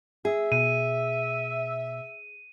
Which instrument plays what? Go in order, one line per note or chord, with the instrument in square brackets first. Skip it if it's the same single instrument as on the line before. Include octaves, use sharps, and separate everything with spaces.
[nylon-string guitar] G#4 [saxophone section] E5
[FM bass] B2 [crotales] D#7